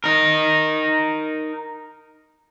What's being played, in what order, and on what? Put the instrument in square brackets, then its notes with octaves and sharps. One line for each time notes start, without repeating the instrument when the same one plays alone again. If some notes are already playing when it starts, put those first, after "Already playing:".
[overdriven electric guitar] D#4 A#4